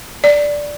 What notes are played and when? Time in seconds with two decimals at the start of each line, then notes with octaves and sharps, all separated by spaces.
0.24 D5